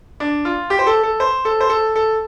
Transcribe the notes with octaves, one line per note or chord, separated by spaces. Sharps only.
D4
F4
G4
C5
A4
A4
C5
A4
C5
A4
A4